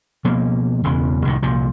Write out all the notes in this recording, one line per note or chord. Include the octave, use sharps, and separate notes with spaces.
B2 F3 A#3
E1 E2 C#3 E3
C2 A2 D#3
C2 A#2 F3